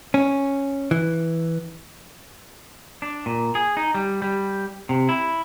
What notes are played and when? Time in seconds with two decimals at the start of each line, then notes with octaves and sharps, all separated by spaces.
0.14 C#4
0.91 E3
3.02 D4
3.26 A#2
3.55 G#4
3.77 D#4
3.94 G3
4.22 G3
4.89 C3
5.09 E4